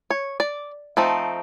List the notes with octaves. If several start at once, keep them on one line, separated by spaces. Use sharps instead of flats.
C#5
D5
F3 A3 C4 D#4